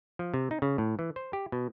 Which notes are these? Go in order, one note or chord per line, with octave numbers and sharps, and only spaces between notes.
F3
C3
D#4
C#3
A2
E3
C5
G4
B2